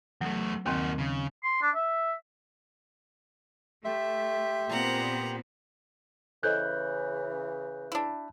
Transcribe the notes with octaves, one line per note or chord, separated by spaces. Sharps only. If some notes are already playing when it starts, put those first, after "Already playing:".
E2 F#3 A3
D#2 D#3 A#3 C4 F#4
C#3
C6
D4
E5
A3 G4 E5 C6
A#2 B3 C4 F#5 A#5
C#3 E3 A4 C5 D#5 F#6 G6
D4 E4